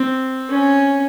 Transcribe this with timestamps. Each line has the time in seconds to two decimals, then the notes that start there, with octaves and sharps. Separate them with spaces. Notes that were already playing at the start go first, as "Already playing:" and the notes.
Already playing: C4
0.50 C#4